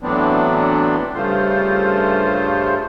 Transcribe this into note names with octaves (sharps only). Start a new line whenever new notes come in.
A2 E3 F#3 B3 C4 D4
G2 C#3 A3 F4 C5